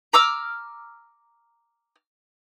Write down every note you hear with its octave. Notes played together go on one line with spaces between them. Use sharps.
A#5 D6 E6 F6